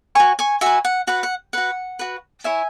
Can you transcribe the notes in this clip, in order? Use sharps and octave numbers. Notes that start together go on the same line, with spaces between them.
F#4 C#5 G#5 C#6
G#5 C#6
F#4 B4 E5 G#5
F#5
F#4 B4 F#5
F#5
F#4 B4 F#5
F#4 B4
E4 C#5 E5 G#5